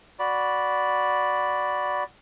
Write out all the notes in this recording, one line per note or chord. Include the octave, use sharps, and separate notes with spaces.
F#4 D5 B5